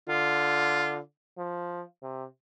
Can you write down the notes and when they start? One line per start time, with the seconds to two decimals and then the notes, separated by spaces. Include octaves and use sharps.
0.09 D3 F4
1.38 F3
2.02 C3